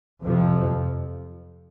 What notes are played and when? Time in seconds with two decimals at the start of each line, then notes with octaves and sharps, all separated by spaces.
0.22 F2 C3 F3